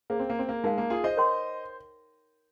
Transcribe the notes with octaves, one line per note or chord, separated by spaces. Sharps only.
A#3 G#4 C5 F5
C4
A#3
C4
A#3
G#3 D#4 A#4 F5
A#3
F4 G#4
C5 D#5
A#4 C#5 G5 C6